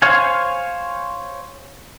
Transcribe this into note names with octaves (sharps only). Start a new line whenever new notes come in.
C5 C#5 F5 G#5